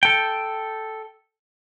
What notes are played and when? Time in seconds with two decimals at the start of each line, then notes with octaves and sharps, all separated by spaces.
0.03 A4 G5